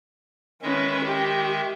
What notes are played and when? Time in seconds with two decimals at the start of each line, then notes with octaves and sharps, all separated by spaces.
0.62 D#3 G#3 C#4 B4 E5
1.05 G4